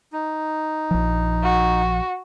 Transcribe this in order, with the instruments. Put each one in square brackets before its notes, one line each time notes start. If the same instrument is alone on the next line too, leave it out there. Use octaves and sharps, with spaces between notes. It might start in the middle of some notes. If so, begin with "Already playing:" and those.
[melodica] D#4
[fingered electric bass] A#1 F3
[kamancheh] F#4